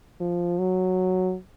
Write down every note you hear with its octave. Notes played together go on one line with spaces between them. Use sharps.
F3
F#3